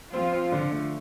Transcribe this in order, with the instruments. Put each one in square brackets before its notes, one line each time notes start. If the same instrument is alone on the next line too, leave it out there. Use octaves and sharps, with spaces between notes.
[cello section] F3 F4 [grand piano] C4
[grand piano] C4
D3
A3